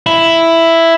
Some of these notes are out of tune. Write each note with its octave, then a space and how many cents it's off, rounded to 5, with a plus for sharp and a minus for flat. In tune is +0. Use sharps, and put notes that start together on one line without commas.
E4 +5